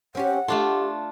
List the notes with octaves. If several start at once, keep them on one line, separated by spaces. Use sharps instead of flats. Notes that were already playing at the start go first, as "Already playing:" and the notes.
C4 C#4 G4 F#5
A3 D4 F4 G4 A4